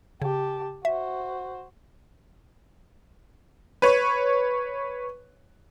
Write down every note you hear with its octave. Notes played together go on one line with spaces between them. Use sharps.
C#3 G4 A5
F#4 C5 E5
B4 C#5